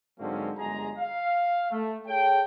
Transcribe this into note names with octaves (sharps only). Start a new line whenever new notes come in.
G#2 D3 F#3 A#3 C4 C#4
G1 F#2 G#3 G#4 A#5
F5
A3
G#4 A4 C#5 G5